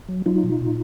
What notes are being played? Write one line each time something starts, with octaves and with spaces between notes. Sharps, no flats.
F#3
F#3 D#4 F4
B2
A#2